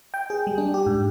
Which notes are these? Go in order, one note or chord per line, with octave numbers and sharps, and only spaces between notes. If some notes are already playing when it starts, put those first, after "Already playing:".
G5
G#4
G3
D4
G4
G#2